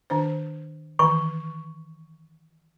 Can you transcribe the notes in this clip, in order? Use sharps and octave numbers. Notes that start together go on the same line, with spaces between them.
D#3 D4 C5
D#3 E3 C#6